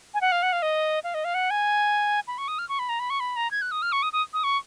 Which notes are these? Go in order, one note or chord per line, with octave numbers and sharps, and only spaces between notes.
G#5
F#5
F5
F#5
F5
D#5
F5
D#5
F5
F#5
G#5
B5
C#6
D#6
F6
C#6
B5
A#5
B5
C#6
B5
A#5
G#6
F#6
D#6
F6
C#6
D#6
D#6
D#6
C#6